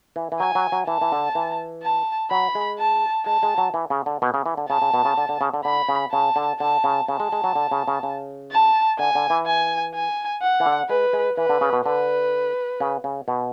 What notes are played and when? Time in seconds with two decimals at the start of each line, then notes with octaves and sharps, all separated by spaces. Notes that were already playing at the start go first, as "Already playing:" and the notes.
0.16 E3
0.32 E3
0.40 F#3 G#5
0.55 F#3
0.72 F#3
0.87 E3 A5
1.01 E3
1.12 D3
1.35 E3
1.83 A5
2.31 F#3 B5
2.55 G#3
2.79 A5
3.26 G#3 A5
3.43 G#3
3.58 F#3
3.74 E3
3.90 C#3
4.06 D3
4.22 B2
4.34 C#3
4.46 E3
4.57 D3
4.69 C#3 A5
4.82 C#3
4.94 B2
5.05 C#3
5.18 D3
5.29 D3
5.41 C#3
5.54 D3
5.65 D3 B5
5.89 C#3
6.12 C#3 A5
6.36 D3
6.60 D3 A5
6.84 C#3
7.08 C#3 A5
7.20 G#3
7.32 G#3
7.44 F#3
7.55 D3
7.71 C#3
7.88 C#3
8.03 C#3
8.51 A5
8.99 D3 G#5
9.15 D3
9.30 E3
9.46 G#5
9.95 G#5
10.42 F#5
10.60 E3
10.66 D3
10.89 G#3 B4
11.13 G#3
11.37 E3 B4
11.49 D3
11.61 C#3
11.73 B2
11.85 D3 B4
12.80 C#3
13.04 C#3
13.28 B2